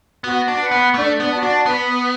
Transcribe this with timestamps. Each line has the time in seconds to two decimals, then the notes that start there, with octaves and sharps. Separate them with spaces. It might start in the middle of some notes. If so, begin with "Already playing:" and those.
0.24 B3 F#4
0.48 D4
0.60 B4 F#5 B5
0.72 B3
0.95 A3 D4
1.20 B3
1.31 F#4 D5 A5
1.43 D4
1.66 B3 B4